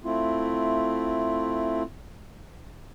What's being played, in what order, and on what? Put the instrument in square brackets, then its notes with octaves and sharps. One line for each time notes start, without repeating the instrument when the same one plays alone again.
[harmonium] A3 C4 E4 F4